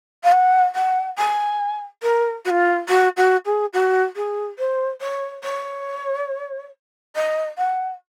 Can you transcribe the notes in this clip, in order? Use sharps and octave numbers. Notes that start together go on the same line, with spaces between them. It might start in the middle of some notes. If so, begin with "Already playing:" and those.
F5
F#5
F#5
G#5
A#4
F#4
F4
F#4
F#4
G#4
F#4
G#4
C5
C#5
C#5
D#5
F#5